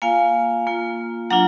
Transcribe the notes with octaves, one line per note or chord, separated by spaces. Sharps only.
A#3 F4 F5 G#5
A#3 F4
F#3 D4 F4 F#5 A#5